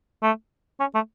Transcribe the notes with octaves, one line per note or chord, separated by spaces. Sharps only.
A3
C#4
A3